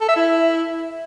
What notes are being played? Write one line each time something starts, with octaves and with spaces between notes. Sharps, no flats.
A4
E5
E4